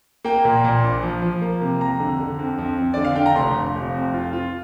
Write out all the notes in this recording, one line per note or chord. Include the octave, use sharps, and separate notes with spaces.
A#3 G5
A#2
A#2
A#1
F3
F3
A#3
C3
F2 A#5
D3
D3
F2
F2
F2
D3 D5
F5
D3 G5
A#5
F1 C6
F1
F1
F2
F4
F4